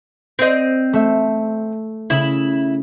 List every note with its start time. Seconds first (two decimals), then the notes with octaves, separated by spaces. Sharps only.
0.39 C4 D#5
0.93 A3 E5
2.10 C#3 E4